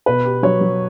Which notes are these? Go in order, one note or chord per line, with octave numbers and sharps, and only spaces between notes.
B2 B4
G4
F#3 C#5
F#3